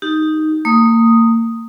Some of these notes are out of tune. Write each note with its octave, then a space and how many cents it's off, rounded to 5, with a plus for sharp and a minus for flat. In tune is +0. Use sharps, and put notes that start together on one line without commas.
D#4 +0 G4 +0
A#3 -35 D#6 +0